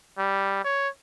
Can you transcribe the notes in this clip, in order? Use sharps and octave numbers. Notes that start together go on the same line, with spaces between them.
G3
C#5